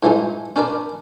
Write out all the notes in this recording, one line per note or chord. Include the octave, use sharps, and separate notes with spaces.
G#2 E3 F3 G#3 D#4
C#4 D4 A#4 B4 D5